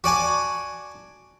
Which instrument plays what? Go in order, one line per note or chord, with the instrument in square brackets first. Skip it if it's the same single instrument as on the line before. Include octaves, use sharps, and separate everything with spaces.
[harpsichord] F#4 D5 G#5 A5